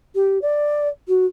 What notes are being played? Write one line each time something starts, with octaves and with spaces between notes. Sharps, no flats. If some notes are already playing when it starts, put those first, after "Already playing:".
G4
D5
F#4